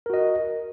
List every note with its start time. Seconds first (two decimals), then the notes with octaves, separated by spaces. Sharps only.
0.06 A#4
0.10 F#4
0.14 D#5